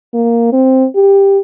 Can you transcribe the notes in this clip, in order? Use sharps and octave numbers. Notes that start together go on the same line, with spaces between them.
A#3
C4
G4